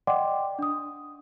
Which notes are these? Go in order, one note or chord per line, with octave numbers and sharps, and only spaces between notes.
D5 D#5 F#5 G5 C6 D6
D4 D#6